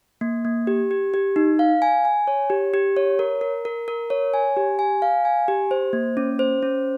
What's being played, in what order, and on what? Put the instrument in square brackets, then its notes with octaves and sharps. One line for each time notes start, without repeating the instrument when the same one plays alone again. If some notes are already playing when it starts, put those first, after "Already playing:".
[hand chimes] A#3
A#3
G4
G4
G4
D#4
F5
G#5
G#5
C#5
G4
G4
C#5
A#4
A#4
A#4
A#4
C#5
G#5
G4
G#5
F5
G#5
G4
C5
A#3
C#4
C5
C#4